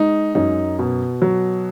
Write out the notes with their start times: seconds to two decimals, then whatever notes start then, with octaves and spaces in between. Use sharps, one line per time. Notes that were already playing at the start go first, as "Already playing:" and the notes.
Already playing: G#3 D#4
0.35 F#2 D#4
0.79 B2
1.22 F#3